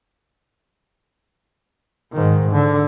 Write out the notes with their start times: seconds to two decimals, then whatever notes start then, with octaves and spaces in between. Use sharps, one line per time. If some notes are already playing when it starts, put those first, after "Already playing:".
2.12 G#2 D#3
2.52 D3